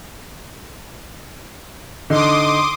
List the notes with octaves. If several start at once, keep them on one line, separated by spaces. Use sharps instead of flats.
D3 D#4 C6 D6 D#6